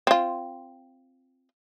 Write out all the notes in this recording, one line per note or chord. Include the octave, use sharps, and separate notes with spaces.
C4 F4